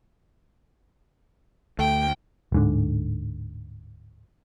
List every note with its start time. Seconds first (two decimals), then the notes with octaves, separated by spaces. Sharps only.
1.79 D2 A3 G5
2.52 D1 G#2 D3